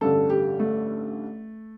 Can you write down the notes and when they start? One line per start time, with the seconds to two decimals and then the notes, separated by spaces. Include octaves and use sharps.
0.01 A1 G2 D3 A4
0.30 G4
0.60 A3